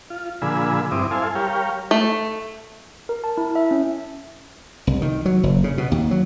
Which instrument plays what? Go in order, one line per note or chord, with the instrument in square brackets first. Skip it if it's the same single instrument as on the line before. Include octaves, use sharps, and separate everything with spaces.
[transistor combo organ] F4
A#2 D3 F3 G#4 B5 E6
G2 C4 E4 D6 D#6
E4 A4 C5 F5 G#5
G3 G4 A#4 C#5 F5
[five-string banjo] A3
[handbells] A#4
A5
E4
E5
C#4
[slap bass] C2
D#3
F#3
F#1
C#3
B2
D#2
F#3